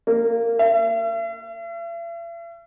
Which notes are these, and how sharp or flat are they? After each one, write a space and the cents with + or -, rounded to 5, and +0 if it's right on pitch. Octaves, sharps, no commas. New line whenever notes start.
A#3 -15
E5 +45